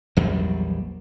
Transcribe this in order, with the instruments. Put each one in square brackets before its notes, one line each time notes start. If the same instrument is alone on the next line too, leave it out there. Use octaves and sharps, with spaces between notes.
[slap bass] A#1 E2 F#3 G3